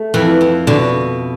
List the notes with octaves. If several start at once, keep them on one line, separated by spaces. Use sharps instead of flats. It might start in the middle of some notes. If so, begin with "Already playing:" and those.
Already playing: A3
F2 E3
F2
B2 D3